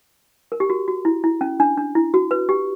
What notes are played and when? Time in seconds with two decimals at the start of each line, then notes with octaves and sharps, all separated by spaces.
0.52 A#4
0.60 G4
0.70 F#4
0.88 F#4
1.05 E4
1.24 E4
1.41 C#4
1.60 D4
1.77 D4
1.95 E4
2.14 F#4
2.31 B4
2.49 G4